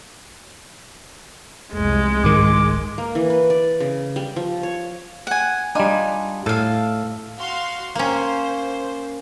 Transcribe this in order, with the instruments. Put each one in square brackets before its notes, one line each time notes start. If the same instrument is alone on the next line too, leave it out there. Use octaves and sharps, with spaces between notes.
[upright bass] F1 C2 [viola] G#3
[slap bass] G#2 D#3 [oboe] D6
[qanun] A#3
E3
B4
D5
C#3
G3
F3
C#5
[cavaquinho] F#5 G#5
[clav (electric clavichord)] G3 D4 [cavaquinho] D#4 F4 G#5
[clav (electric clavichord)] A2 [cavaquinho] A4 F5
[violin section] F#4 F5 C6
[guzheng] A#3 C#4 [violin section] C5